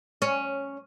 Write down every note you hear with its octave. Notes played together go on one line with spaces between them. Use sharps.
C#4